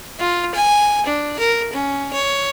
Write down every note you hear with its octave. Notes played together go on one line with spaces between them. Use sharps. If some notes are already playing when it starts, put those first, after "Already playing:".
F4
G#5
D4
A#4
C#4
C#5